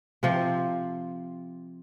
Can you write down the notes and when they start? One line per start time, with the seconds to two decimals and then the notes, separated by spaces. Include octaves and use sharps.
0.23 C3 F3 C4